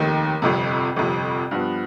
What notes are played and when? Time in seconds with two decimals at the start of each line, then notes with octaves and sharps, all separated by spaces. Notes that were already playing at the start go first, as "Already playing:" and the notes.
Already playing: F1 D#2 D#3
0.42 G1 F2 C3
0.96 G1 F2 C3
1.51 G2 F3 B3